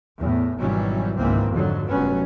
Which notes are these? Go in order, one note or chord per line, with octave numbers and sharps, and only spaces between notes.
E2 A2
G#1 B2 E3 F#3 G3 C#4
G#1 C#2 G#2 E3 A#3 C4
F2 G#2 D3 F#3
F1 G2 F#3 B3 C#4